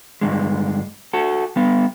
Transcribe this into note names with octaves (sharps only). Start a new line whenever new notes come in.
G2 D3 G#3
F#4 A4
G3 B3